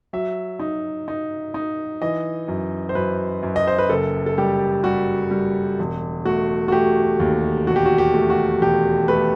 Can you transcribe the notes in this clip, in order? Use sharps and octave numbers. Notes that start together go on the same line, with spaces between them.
F#3 E5
D#4
D#4
D#4
E3 D#5
F#2
C5
F#2 B4
F#2
D#5
C5
B4
F#1 A4
A4
G3 G4
G3 F#4
G3
E1
A3 F#4
F#4
A3 G4
D#2
E1 F#4
G4
F#4
G4
A3
F#4
E1 G4
A3 B4